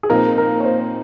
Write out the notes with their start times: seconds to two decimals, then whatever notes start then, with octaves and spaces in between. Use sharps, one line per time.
0.03 G#4
0.10 A#2 F3 C4 D#4 A#4
0.38 A#4
0.60 C#5
0.65 C5